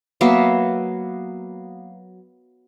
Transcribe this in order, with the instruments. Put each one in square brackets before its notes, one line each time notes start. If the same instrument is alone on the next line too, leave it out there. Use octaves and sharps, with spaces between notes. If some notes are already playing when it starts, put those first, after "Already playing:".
[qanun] F#3 A#3 B3 E5